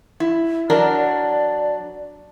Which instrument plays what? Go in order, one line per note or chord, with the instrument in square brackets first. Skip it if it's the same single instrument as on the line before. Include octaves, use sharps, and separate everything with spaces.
[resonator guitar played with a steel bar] E4
[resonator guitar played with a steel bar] F#3 D4 A#4 [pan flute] D5